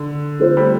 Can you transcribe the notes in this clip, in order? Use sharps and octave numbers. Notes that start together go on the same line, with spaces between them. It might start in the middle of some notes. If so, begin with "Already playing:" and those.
Already playing: D3
D3 A3 C4 F4 C5
G3